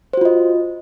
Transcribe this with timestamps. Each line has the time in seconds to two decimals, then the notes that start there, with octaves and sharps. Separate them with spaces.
0.13 C5
0.17 F#4
0.21 F4
0.25 D#5